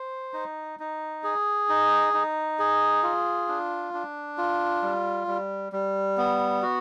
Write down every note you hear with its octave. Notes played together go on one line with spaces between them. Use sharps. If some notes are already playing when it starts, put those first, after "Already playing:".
Already playing: C5
D#4
D#4
G#4
D#4
D#4
G#4
F4
D4
D4
F4
G3
G3
G3
B3
F#4